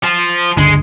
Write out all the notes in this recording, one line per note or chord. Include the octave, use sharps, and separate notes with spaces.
F3
G1 C#2 D3 G#3